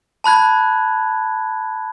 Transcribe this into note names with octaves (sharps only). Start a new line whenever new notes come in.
A5 B5 F#6 G#6